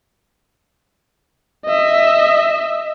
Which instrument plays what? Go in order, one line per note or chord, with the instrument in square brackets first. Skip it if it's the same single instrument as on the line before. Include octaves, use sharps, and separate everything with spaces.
[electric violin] D#5 E5